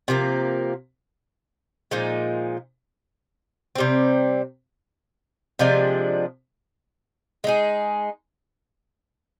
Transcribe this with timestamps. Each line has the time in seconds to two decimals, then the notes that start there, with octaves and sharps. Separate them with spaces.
0.08 C3 F3 A#3
1.91 A#2 F3 G#3 D#4
3.75 C3 G3 C4
5.59 C3 F3 G#3 D4
7.44 G#3 D#4 G#4